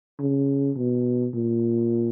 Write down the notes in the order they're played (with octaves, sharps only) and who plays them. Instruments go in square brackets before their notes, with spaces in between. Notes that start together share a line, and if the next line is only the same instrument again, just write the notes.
[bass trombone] C#3
B2
A#2